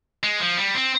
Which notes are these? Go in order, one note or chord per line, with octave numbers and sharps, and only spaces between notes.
G#3
F3
G3
C4